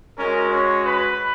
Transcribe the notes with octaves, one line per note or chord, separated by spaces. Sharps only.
G#3 C#4 F#4 A#4
C#4 C#5
B4 B5